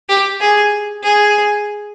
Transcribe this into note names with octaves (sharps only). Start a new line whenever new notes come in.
G4
G#4
G#4